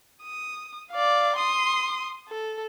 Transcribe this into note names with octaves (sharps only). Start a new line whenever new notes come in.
D#6
D5 F5
C6 D#6
A4